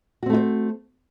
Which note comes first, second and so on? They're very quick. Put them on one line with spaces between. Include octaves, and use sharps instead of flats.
F#4 C4 A3 E4 C5